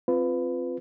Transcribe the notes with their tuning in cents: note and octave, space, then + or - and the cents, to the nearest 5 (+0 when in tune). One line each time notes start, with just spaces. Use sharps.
C4 +0 F4 +0 B4 +20